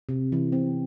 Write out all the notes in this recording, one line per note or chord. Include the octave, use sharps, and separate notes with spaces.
C3
E3
C4